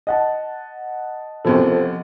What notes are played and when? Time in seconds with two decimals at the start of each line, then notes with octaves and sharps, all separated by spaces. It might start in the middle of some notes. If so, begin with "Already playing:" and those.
0.07 D#5 F#5 A5
1.45 C2 F#2 B2 F3 A4